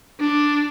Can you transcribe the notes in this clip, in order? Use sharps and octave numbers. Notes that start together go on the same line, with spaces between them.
D4